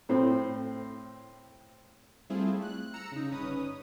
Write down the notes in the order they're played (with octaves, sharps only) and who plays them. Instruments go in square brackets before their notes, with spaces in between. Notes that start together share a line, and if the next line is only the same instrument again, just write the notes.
[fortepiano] A2 C4
[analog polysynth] G3 A3 C4 E4 F4 G#4
F#6
A#5 E6 C#7
C#3 D#4
G1 C#4 B4 D#6